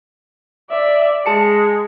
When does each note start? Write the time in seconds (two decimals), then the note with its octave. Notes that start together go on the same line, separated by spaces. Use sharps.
0.70 D5 E5
1.26 G#3 G#4 A5 C#7